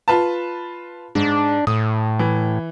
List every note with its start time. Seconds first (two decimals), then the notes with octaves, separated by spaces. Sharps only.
0.08 F4 B4 A5
1.15 G#2 D4
1.67 A2 D#6
2.19 E3